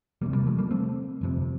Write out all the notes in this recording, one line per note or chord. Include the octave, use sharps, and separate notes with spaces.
E1 D2 C3 G3 A#3
G3 A#3
F3 A3
G3 A#3
A3 C4
G1 F2 C3